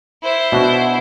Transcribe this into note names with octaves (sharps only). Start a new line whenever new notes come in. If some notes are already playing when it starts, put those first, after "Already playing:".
E4 C5
B2 D4 F#4